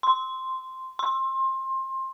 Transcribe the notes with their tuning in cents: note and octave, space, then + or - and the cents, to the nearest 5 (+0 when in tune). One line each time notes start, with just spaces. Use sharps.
C6 -5
C6 +25